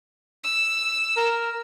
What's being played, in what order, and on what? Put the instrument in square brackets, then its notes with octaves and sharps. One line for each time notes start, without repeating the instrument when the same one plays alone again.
[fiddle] E6
[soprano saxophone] A#4